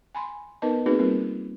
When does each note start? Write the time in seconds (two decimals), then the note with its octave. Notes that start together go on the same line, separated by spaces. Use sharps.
0.15 G#5 B5 C6
0.62 B3 D#4 A#4 B4 D#5 A5
0.86 A#3 C4 D#4 F#4 G#4 B4
0.99 G3 C4 F4 A#4